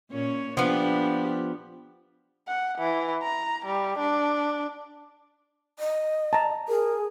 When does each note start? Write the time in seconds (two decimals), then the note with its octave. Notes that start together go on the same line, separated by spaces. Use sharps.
0.11 A#2 C#4 C#5
0.57 F3 B3 D4 G4
2.48 F#5
2.79 E3
3.23 A#5
3.66 G3
3.99 D4
5.79 D#5
6.33 A5 A#5
6.68 G#4 A#4